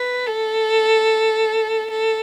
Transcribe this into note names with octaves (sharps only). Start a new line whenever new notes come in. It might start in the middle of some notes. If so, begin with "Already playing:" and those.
Already playing: B4
A4
A4